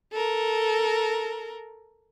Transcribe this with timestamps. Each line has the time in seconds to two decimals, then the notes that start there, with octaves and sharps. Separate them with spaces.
0.12 A4 A#4